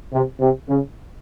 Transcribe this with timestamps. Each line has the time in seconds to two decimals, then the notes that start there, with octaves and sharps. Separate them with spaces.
0.12 C3
0.40 C3
0.68 C#3